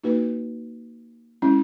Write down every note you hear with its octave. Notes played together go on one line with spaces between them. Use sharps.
A#3 D#4 F#4 B4
G#3 C#4 E4